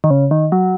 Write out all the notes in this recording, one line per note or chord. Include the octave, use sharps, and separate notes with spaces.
D#3
C#3
D#3
F#3